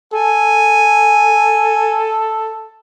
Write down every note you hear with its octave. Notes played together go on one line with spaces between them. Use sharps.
A4 G#5